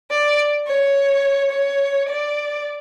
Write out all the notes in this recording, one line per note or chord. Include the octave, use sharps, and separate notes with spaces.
D5
C#5
C#5
D5